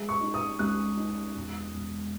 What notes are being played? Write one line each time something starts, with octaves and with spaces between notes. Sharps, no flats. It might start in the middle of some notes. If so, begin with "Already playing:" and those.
Already playing: G#3
C#6
D#4
D#6
C#2 F#6
D#4
E1
E1